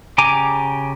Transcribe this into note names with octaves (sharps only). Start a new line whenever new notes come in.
C#3 G4 G#5 A#5 D6